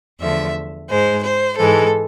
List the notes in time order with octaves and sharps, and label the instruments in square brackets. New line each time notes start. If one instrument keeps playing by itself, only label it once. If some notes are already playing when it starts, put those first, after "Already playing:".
[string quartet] E2 D3 F3 A3 E5
G#2 G#3 C5
C5
G#2 E3 G#3 A4